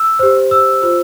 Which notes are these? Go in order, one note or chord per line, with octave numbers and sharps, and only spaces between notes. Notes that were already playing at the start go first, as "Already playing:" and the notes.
Already playing: E6
G4 C5
E6
F4 C5